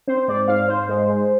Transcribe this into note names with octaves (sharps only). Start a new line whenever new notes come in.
C4 C5
G#2 D5
G#2 F5
G#2 C5
G#3
G#3